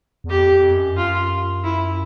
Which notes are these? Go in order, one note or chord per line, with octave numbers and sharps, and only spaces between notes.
E2
F2 G4
F2
F#2
F4
E4